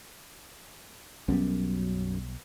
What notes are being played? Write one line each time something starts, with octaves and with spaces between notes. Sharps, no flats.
B1 F#2 G3 B3